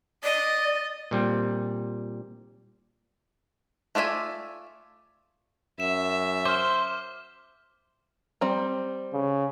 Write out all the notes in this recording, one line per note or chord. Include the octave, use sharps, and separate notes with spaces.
D5 D#5
A#2 G3 C4
A3 F4 D5 E5 G#5
F#2 E5 E7
C5 D6 F6
G3 C4 A#5
C#3